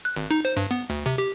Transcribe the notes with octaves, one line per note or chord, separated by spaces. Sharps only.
F#6
G#1
D#4
C5
G2
B3
D2
C3
G4